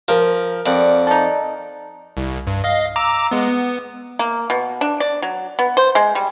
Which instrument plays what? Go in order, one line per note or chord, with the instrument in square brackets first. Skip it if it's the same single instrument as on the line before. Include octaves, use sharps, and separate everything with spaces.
[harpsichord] F3 [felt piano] A#4
[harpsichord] F2 [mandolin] D5 F#5
[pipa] D#4 A4
[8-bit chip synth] C2
G2
D#5 F5
A#5 D6 E6
G#3 B3
B3
[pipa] A#3
B2
D4
D5
F#3
B3
C5
G#3
G3